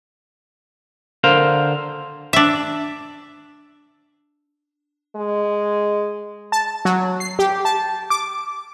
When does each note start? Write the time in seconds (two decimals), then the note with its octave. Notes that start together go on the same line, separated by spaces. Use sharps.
1.24 D3 A#4 C5 F5
2.33 D4 E5
5.16 G#3
6.52 A5
6.85 F#3
7.20 C7
7.39 G4
7.65 A5
8.10 D6